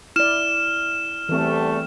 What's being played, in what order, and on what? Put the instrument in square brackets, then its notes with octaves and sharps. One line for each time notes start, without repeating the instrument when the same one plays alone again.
[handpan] E4 D5 [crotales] F6 E7
[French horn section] E2 G3 A3 [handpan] E3 C4